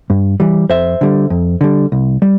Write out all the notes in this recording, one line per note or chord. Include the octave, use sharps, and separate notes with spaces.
G2
E3 G3
F2 C5 E5
D3 G3
F2
D3 G3
C2
G3